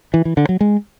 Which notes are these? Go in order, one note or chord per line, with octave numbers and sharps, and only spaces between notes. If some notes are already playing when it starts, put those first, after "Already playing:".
E3
E3
D3
F#3
G#3